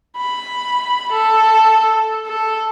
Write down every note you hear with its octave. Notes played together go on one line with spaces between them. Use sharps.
B5
A4
A4